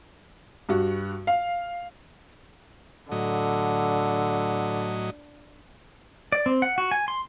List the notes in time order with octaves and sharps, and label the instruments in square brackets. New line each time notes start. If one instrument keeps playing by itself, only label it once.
[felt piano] G2 F#4
F5
[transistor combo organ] A2 F#3 D#5 [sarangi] D3
[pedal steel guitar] D5
C4
F#5
F#4
G#5
C6